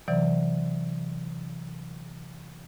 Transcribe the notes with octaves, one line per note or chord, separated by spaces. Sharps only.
C3 E3 F#3 D5